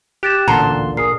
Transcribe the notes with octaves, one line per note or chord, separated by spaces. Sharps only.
G4 F#6 A6 E7
A1 D2 A#2 D3 A5 A#5 C6
G#4 A#4 D#6 C7